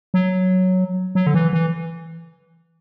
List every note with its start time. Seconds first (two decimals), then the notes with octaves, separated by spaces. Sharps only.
0.14 F#3
1.15 F#3
1.27 D3
1.34 E3
1.53 E3